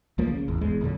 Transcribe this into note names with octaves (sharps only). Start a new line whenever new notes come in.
C#2 F3 A#3
C#3
G#1 E2
D#1 E2 G#3
A#1 F2 D3 F#3